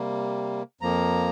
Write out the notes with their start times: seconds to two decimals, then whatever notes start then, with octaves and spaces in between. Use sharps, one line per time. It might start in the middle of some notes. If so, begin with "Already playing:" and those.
Already playing: C3 G3 A#3
0.81 F2 F3 A#3 A#5